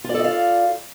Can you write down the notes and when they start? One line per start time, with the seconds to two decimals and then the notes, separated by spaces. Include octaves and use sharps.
0.04 F4
0.09 D5
0.14 A4
0.19 D#5
0.24 F5